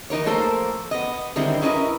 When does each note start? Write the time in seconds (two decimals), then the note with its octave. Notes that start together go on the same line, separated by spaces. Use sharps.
0.10 E3 D#4 A#4 C#5
0.26 F3 A3 A#3 A4 A#4 C5
0.91 B3 D#5
1.36 D3 D#3 G3 G#3 C4 E4
1.62 C#4 E4 A#4 B4 D#5